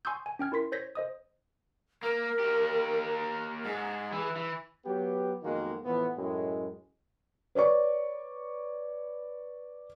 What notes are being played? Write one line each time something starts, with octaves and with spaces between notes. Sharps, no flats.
G#5 C6 C#6 D#6 E6 G6
G#5
C#4 G5 F6 G#6
E4 A#4 C6 B6
C5 C#5 G6 G#6 A#6 B6
C5 D#5 D#6
A#3 A#4
A#3 G4
G#2 G#4
E3
E3
F#3 B3 G4
B1 F2 D#3 G#3 A#3 F#4
A2 E3 F3 B3
F#2 A2 G#3
B4 C#5 D5 C#6